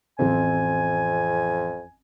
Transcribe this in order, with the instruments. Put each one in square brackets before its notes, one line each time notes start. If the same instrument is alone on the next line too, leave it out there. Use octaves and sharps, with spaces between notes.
[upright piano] A1 C4 [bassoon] F2 [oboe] G#5